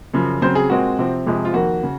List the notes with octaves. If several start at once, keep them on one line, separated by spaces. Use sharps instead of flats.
F#2 C#3 F3
C#3 F#3 C4 C5
G#4
A#2 G#3 C4 F#4
C3 F3 C4
F2 C3 F3 G#3
F4
F2 D#3 A#3 F#4
C#3